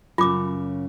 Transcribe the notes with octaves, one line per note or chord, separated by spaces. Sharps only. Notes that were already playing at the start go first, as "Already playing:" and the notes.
F#2 C#3 F4 D6